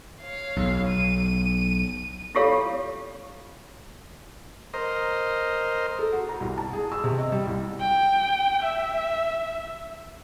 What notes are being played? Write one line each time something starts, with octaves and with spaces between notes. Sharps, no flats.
C#5 F5
B1
D#7
E4 F4 G4 A4 C#5 F5
A#4 C5 D#5
A4
F#4
A#5
C2
A5
G#4
E6
C3
D#5
G3
C2
G5
E5